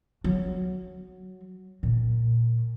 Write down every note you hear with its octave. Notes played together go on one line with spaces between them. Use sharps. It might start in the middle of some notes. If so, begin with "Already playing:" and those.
F#3
A#2